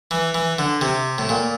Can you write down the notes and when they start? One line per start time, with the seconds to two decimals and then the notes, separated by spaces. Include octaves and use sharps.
0.11 E3
0.35 E3
0.59 D3
0.81 C3
1.18 A2
1.29 A#2